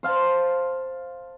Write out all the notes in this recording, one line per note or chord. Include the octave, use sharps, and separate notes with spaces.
C5 F5 A5